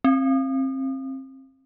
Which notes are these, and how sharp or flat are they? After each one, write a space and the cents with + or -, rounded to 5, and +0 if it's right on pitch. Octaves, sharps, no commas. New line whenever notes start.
C4 +30